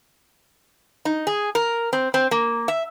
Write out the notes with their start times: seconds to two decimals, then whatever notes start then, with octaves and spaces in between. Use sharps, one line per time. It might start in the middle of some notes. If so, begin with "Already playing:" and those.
1.05 D#4
1.27 G#4
1.55 A#4
1.93 C4
2.14 C4
2.31 A#3
2.68 E5